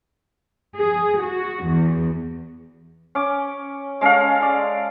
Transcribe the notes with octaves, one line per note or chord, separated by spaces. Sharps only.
G#4
F#4
E2
C#4 D6
G#3 C#4 A4 F5
D5